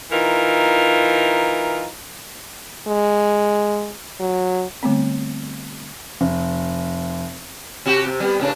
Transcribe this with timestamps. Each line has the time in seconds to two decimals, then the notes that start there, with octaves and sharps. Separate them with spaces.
0.11 E3 D#4 F4 A#4
2.87 G#3
4.20 F#3
4.83 D3 G3 A3 B3 C4
6.21 F1
7.86 C3 F#4 G4
8.07 C3
8.20 G3 B3
8.40 A2 C#3 D4